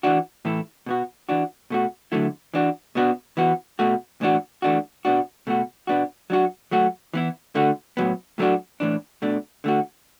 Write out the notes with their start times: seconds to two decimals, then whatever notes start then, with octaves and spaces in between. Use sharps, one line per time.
0.03 E3 D4 F#4
0.45 A2 E3 A3 E4
0.86 B2 B3 F#4
1.29 E3 D4 F#4
1.70 B2 A3 F#4
2.12 D3 F#3 A3 E4
2.54 E3 D4 F#4
2.95 B2 B3 D4 F#4
3.37 E3 B3 F#4
3.79 B2 A3 F#4
4.21 A2 E3 D4 F#4
4.62 E3 A3 D4 F#4
5.05 B2 B3 D4 F#4
5.47 B2 A3 F#4
5.87 B2 B3 D4 F#4
6.30 F#3 D4 F#4
6.71 F#3 A3 F#4
7.14 E3 B3 E4
7.55 D3 A3 F#4
7.97 A2 F#3 B3
8.38 A2 F#3 A3 D4 F#4
8.80 A2 E3 D4
9.22 B2 A3 D4
9.64 D3 A3 F#4